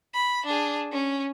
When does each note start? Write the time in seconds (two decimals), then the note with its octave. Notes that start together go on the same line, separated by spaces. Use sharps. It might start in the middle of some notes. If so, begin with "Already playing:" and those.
0.14 B5
0.45 D4 G#4
0.92 C#4